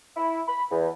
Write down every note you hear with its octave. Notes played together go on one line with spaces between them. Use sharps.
E4
B5
E2